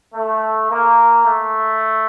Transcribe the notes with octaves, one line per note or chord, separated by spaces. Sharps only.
A3
A#3
A3